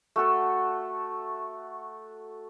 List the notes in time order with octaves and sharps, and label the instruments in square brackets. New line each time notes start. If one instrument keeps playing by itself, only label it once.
[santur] A3 F#4 A4